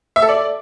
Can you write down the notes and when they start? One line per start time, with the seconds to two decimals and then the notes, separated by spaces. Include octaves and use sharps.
0.16 E5
0.22 A4
0.29 D5